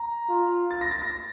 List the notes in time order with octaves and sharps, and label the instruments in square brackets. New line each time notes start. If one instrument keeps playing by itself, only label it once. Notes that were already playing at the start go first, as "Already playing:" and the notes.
Already playing: [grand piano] A#5
[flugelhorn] F4
[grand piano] A6
A#6
A6
A#6